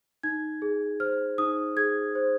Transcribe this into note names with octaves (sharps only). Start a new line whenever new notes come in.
D#4 G#6
G#4
C5 F6
D#4 D#6
G#4 G#6
C5